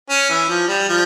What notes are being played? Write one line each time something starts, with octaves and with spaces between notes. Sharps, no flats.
C#4
E3
F3
G3
F3